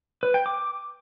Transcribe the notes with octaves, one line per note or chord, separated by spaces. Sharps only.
B4
G5
D6